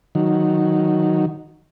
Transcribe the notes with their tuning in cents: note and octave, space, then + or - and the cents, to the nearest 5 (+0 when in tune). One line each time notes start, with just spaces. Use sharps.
D#3 +0 F#3 -5